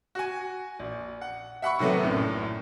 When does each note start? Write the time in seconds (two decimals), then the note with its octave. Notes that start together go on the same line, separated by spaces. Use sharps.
0.15 F#4 G#5
0.79 A#1
1.21 F#5
1.62 E5 F#5 B5 C#6
1.79 C3 D#3 F#3 A3 B3
2.03 A#1 F#2 A2